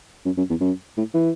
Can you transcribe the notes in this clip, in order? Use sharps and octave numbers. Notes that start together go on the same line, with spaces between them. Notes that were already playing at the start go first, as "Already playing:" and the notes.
F#2
F#2
E2
F#2
A2
E3